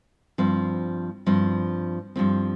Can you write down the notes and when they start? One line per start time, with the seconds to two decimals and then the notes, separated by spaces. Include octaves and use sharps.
0.38 G2 F3 C4
1.26 G2 F3 C4
2.16 G2 F3 C4